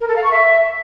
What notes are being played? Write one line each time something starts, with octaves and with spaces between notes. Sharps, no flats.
A#4
A4
F5
C#6
E5